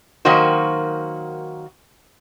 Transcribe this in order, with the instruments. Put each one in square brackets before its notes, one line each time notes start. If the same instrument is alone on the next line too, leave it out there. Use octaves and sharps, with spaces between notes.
[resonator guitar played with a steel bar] D#3 F#3 A#3 F#4 C5